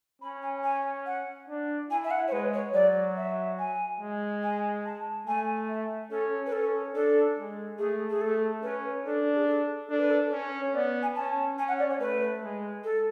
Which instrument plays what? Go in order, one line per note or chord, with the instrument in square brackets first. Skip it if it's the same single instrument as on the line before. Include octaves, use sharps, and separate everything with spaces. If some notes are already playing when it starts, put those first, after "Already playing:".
[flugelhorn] C#4 [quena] B5
[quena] G#5
G#5
F#5
[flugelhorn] D4
[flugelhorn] E4 [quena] G#5
[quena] E5
F#5
C#5
[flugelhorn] G#3 [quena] B4
[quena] C#5
[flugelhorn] F#3 [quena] D5
[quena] E5
G#5
[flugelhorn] G#3
[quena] G#5
A5
[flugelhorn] A3 [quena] G#5
[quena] E5
[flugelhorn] C#4 [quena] A4
[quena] B4
[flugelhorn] C#4 [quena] A4
[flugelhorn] D4 [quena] A4
[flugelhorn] G#3
[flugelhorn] A3 [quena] G#4
[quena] G#4
[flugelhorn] A3 [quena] A4
[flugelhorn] C#4 [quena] B4
[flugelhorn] D4 [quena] A4
[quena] G#4
A4
[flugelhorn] D4 [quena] A4
[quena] B4
A4
[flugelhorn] C#4 [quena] C#5
[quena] C#5
[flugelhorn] B3 [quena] D5
[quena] G#5
[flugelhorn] C#4 [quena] A5
[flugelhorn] C#4 [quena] G#5
[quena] F#5
D5
C#5
[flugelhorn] A3 [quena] B4
[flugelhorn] G#3
[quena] A4